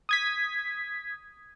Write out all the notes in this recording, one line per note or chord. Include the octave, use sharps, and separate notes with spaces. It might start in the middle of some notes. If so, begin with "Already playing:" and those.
D#6 G#6 B6